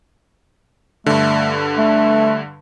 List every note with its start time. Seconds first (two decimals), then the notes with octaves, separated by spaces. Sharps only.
1.06 G2 D3 A3
1.78 A3